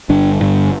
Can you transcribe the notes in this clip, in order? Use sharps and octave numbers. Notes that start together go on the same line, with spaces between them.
G1 G2 D3 D4
G1 G2 D3